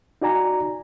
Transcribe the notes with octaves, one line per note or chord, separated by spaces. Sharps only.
D#4 F#4 D5 G#5 A#5